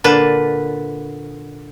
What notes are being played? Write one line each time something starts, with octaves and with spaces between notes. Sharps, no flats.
A#2 D3 B4 A5